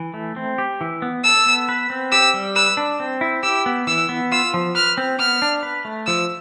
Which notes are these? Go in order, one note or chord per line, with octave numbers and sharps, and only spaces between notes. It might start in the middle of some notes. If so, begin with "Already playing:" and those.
Already playing: E3
A3
C4
G4
E3
B3
A4 E6
B3
B4
C4
G4 E6
G3
B4 E6
D4
C4
E4
G4 E6
B3
E3 E6
B3
F4 E6
F3
B4 F6
C4
B3 F6
D4
B4
A3
F3 E6